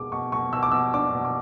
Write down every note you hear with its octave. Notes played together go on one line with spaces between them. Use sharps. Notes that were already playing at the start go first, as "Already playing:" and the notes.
Already playing: B2 G#3 D6
B2 C#6
B2 C#6
B2 E6
D6
B2 E6
D4 D6
B2
D6